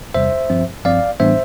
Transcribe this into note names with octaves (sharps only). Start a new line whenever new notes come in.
E2 C3 G3 C5 E5
G2 F3 C4
G2 F3 C4 D5 F5
A2 E3 G3 B3 D4 C5 E5